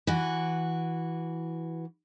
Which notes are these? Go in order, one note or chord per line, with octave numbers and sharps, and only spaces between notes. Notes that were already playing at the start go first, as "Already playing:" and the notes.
E3 F#4